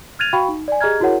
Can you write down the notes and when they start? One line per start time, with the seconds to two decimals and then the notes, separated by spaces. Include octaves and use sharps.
0.19 F6 F#6 G#6 A6 D#7 F7
0.33 F#4 F5 G5 B5 C#6
0.49 D#4
0.68 D5 G#5
0.81 G4 G#4 D#5 A#5 F6 G#6
1.00 E4 F#4 G#4 A#4 C#5 F#5